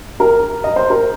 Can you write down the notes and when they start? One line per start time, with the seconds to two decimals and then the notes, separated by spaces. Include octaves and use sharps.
0.20 A#4
0.64 D#5
0.76 C5
0.90 A#4